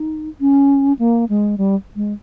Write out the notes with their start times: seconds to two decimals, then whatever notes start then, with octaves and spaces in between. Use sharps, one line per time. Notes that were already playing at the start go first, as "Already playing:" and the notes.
Already playing: D#4
0.40 C#4
0.99 A#3
1.29 G#3
1.58 G3
1.96 G#3